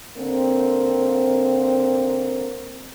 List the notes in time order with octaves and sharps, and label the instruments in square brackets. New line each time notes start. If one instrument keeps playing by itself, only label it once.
[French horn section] D3 A#3 C4